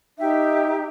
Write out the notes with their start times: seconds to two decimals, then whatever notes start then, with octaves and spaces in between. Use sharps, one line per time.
0.18 D#4 G4 E5